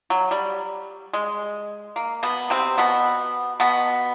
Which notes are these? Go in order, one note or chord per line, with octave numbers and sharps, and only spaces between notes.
F#3
G3
G#3
A#3
B2 B3
C3 C4
B2 B3
B2 B3